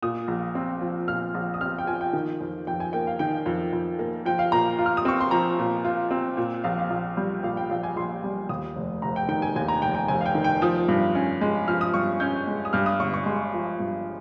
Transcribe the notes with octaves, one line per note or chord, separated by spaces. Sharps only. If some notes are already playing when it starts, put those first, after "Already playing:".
A#2 D#6
A#1
C4
F3
A#2 F6
A#1
D#6
C4 F6
G5
F3 G#5
G5
D#3
F2
F2 G5
G#5
A#3 G5
F5
D#3 G5
F2
F2
A#3
F3 G5
F5
A#2 A#5
F4
F6
D#6
C4 C#6
C6
F3 A#5
A#2
F4
C4
A#2
A#1 F5
F5
A#1
G3
A#2 F5
G5
A#1 F5
G#5
A#1 C6
G3
D#2 D#6
F1
F1 A#5
G5
D#3 G5
G#5
D#2 G#5
A#5
F1 G5
G5
F1 G#5
F5
G5
D#3
G5
F3 D#6
G2
C#4
G#3
F3 F6
D#6
G2 C#6
C#4 G6
G#3
D#6
G2 F6
D#6
G1 C#6
C#6
G#3 C6
F3
G2